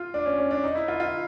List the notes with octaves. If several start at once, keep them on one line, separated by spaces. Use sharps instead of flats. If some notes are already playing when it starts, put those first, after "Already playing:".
Already playing: F4
D4
C#4
C#4
D4
D#4
E4
F4
F4